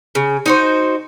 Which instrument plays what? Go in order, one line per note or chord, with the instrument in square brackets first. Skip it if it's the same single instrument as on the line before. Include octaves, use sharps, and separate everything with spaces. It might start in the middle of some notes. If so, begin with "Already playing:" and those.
[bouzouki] C#3
D#4 F#4 C5